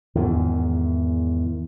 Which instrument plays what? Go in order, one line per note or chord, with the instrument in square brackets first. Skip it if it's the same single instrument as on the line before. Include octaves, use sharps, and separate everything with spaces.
[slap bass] E2 G#2 D#3